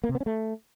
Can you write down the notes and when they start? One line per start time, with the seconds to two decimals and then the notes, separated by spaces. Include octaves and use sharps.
0.04 A#3
0.09 C3
0.15 B3
0.20 C#4
0.26 A3